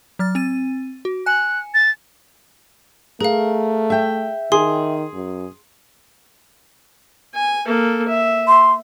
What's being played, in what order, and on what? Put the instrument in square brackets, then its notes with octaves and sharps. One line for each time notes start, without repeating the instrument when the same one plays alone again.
[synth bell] F#3 F6 A6
C4 A6 D#7
F#4
[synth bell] G#5 C#7 [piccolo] F#6
[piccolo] A6
[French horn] A3 [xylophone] G#4 F5 [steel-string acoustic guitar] A#4
[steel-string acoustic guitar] E5 G5
[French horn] D#3 [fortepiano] G#4 [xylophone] C6
[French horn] F#2
[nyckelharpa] G#5
A#3 A4
E5
[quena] C6